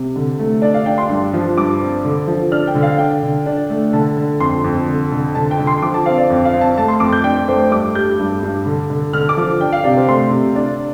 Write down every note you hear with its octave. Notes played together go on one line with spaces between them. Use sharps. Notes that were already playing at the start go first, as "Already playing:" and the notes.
Already playing: C3
D3
A3
D4 D5
F5
D4 G5
C6
G2
F3
G2 D6
C4
D3
F3
D4 F6
G5
D3
F5
D4 G5
D3
D4
A3
D3 A5
D3
F2 C6
F2
D3
D3
D3 A5
G5
D3
C6
F3 D6
A5
C4 F5
D5
F2
F5
C4
A5
A3 A5
C6
F2 D6
G6
D4 G5
A3 C5
G2 D6
G3 G6
G2
G2
D3
D3
D3 F6
D6
F3
D4 G5
F5
C3 D5
C5
A3 C6
C3
D4